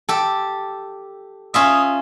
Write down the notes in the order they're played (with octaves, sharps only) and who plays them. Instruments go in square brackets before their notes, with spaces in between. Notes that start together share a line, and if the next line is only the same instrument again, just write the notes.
[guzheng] G4 A4
[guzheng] C#4 F4 E5 [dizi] D#6